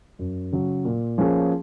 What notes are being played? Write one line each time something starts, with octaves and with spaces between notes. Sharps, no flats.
F#2
C#3 F#3
A#2
F3 A#3 C#4 G#4